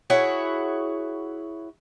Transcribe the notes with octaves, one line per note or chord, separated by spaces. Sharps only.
E4 F#4 G#4 C#5